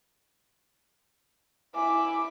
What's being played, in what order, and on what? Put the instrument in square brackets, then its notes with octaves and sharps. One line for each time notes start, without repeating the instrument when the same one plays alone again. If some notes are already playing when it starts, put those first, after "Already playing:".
[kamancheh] E4 D6 [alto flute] G#5